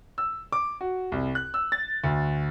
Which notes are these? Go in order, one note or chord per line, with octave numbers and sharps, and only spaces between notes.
E6
D6
F#4
C2
F#6
E6
A6
D2